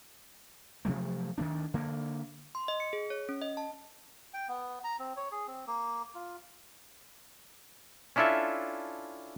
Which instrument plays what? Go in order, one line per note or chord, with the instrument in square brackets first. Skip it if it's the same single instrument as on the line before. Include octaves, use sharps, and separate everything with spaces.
[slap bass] C3 F3 F#3 A3
D2 D#3 A#3 D4
D3 A#3
[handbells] C6
D#5
C#7
G#4
C#5
C#4
D#5
A5
[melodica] G5
B3
A#5
C4
C#5
G#4
C4
A#3
F4
[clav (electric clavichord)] C#4 D4 E4 F4 A4 E5